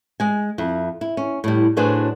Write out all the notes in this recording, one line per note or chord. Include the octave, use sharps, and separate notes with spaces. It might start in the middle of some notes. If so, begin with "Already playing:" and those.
G#3 G#5
F2 E4
E4
C#4
A2 G3
A2 F#3 D4 G#4 B4 C5